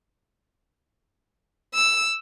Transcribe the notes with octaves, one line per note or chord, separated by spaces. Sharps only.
E6